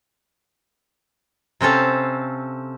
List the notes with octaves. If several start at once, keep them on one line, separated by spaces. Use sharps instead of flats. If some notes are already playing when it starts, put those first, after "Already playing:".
C3 C4 C#4 A4 F5